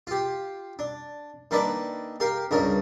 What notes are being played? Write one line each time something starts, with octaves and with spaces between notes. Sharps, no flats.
F4 G4
D4
D#3 A#3 D4 E4 B4 D5
G4 A#4 F5
C#2 G2 A#4 C#5